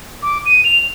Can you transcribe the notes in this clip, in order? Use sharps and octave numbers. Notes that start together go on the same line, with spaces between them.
D6
D#7
F7